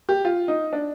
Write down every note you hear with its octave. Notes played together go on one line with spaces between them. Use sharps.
G4
F4
D#4
D4